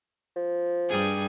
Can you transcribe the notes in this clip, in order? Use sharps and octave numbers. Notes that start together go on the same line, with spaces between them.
F3
G2 G3 G#4